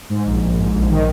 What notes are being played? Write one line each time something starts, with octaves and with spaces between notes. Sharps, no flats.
G#2
A#1
A#1
G#2
A#1
D#3